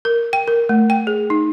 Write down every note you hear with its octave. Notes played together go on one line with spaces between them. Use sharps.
A#4
G5
A#4
A3
G5
G#4
D#4